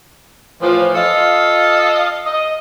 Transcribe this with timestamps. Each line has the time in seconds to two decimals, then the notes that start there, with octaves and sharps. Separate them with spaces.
0.62 A2 E3 F3
0.95 F4 A4 D#5 F5
2.26 D#5